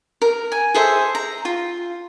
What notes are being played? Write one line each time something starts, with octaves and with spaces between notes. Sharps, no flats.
A#4
G#5
G#4 A4 C5 E5
A#5
F4